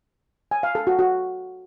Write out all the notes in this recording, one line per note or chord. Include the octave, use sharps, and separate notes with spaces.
G#5
F5
A4
F#4
F#4